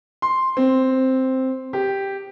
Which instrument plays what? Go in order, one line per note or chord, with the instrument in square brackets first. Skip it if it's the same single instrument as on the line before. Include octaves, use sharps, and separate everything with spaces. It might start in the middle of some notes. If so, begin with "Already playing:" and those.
[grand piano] C6
C4
G4